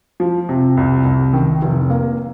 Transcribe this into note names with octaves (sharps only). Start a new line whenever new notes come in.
F3
C3
C2
C2
D#3
F1
A#3